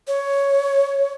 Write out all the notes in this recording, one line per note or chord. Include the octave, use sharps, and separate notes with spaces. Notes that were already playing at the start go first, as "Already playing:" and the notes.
C#5